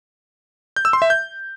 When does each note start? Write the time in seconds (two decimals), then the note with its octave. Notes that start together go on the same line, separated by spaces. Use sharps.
0.76 G6
0.85 E6
0.93 C6
1.02 E5
1.10 G6